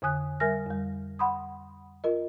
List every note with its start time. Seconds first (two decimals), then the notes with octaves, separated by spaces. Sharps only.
0.02 F2 D3 G#5 D#6 F#6
0.40 G3 A#4 E5 G#5 F6 A#6
0.66 F2 G3
1.19 F#5 B5 C6 D#6
2.04 F4 A#4 D#5